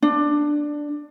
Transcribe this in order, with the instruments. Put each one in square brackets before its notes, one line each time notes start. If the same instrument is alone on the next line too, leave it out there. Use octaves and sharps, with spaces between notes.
[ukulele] D4